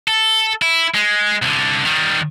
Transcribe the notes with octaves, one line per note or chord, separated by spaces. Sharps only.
A4
E4
G#3
C2 D3
D#3 G3